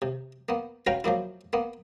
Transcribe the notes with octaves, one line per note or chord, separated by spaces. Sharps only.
C3
A#3 B3
C#4 F#4 B4 F5 G5 A#5
F3 F#3 A#3 E4
A#3 B3